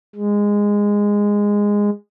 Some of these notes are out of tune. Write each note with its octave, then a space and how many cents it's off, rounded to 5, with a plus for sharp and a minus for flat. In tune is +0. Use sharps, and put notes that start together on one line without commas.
G#3 -15